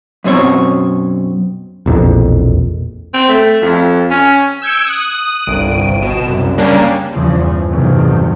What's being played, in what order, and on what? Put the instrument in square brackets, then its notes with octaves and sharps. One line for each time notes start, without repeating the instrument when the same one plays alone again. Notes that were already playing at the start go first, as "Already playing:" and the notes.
[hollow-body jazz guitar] F#2 B2 C4 C#5
[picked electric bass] E1 A#1 F2
[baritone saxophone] C4
A3
F2
C#4
[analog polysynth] E6 G6 G#6 C#7 D7 E7
D#6 F#6
G1 C2 D7 D#7
B2 E7
C2 F#2
C#3 G3 A#3 C#4 D4
[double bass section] E2 G2 C#3 E3 F3
A1 E2 G2 C3 D#3 F#3